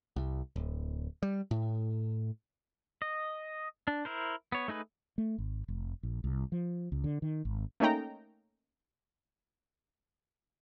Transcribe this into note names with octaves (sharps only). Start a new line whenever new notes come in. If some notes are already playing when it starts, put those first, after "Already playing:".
C2
D1
G3
A2
D#5
D4
E4 A#4 C5
B3 C#5
A3 D#4 G#4 B4
A3
G#1
F1
A#1
C2
F3
C#2
D3
D#3
G#1
A3 A#3 C#4 D#4 G5 A#5